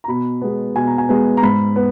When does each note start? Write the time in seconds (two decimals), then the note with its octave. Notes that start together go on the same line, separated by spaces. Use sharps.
0.04 A#5
0.08 B2 B5
0.41 G#3 B3
0.76 B2 G#5
0.87 A#5
0.98 G#5
1.09 G#3 B3
1.37 A#5
1.43 G#2 B5
1.76 B3